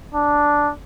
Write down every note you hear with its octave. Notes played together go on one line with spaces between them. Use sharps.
D4